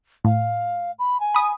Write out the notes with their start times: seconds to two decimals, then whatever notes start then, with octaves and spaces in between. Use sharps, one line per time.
0.25 A2 F5
0.98 B5
1.20 G#5
1.35 B5 D#6